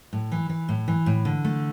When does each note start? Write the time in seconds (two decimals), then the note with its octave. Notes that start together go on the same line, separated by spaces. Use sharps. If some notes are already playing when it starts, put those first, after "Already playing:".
0.13 A2
0.32 E3
0.49 E3
0.69 A2
0.88 E3
1.06 A2
1.25 D3
1.44 A3